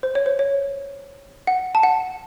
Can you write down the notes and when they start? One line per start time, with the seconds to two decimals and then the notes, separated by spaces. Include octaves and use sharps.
0.03 C5
0.15 C#5
0.26 C5
0.39 C#5
1.47 F#5
1.75 A5
1.83 F#5